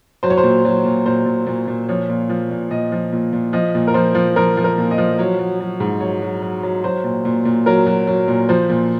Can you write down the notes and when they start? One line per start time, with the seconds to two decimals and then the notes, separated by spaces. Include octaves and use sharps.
0.23 F#3 C5
0.30 C#5
0.38 C5
0.43 A#2
0.65 F#3
0.85 A#2
1.06 A#2 C5
1.26 A#2
1.47 A#2
1.67 A#2
1.89 F3 C#5
2.10 A#2
2.29 F3
2.51 A#2
2.71 A#2 D#5
2.92 F3
3.13 A#2
3.33 A#2
3.53 F3 D#5
3.75 A#2
3.87 A#4
3.94 F3 C5
4.15 F3
4.36 F3 A#4
4.57 F3
4.64 A#4
4.78 A#2
4.91 D#5
4.98 F3
5.19 F#3 C#5
5.39 F#3
5.60 F#3
5.80 G#2
6.01 F#3 C#5
6.22 F#3
6.42 F#3
6.63 F#3
6.84 F#3 C5
7.04 A#2
7.25 A#2
7.45 A#2
7.66 F#3 A#4
7.87 F#3
8.07 F#3
8.28 A#2
8.49 F3 C5
8.69 A#2